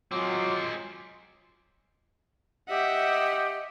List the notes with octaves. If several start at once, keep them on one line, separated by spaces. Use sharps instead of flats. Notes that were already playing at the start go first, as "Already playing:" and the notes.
F#3 G#3 C4 F4 D6
G4 D#5 E5 F#5